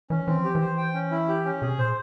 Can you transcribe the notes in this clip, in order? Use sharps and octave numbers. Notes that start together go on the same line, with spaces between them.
E3 C#4
E3 C4
F3 G4
E3
C5
G5
C#4
E4
G4
C#4
C3 G#4
A#2 C5